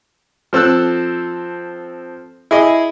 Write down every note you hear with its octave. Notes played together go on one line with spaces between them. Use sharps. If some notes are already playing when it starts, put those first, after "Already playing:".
F3 C4 A4 E6 F#6
E4 G#4 D#5